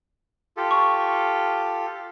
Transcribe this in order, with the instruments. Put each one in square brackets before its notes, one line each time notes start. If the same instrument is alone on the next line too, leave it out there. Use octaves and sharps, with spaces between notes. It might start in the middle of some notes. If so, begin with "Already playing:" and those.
[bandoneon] F4 G4 A4
[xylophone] C#6